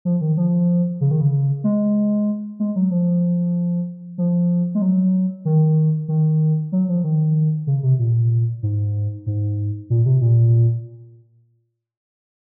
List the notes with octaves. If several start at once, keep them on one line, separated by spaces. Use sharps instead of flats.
F3
D#3
F3
C#3
D#3
C#3
G#3
G#3
F#3
F3
F3
G#3
F#3
D#3
D#3
F#3
F3
D#3
C#3
C3
A#2
G#2
G#2
A#2
C3
A#2